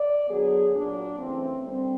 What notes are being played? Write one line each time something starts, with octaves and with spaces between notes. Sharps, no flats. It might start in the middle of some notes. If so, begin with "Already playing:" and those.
Already playing: D5
D3 F#3 B3 G#4
A#2 F#3 A#3 D4
C#3 E3 A3 C4
D3 G3 A#3 C4